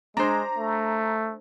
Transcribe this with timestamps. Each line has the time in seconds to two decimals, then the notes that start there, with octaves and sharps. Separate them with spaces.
0.17 G#3 D4 C5 A#5
0.58 A3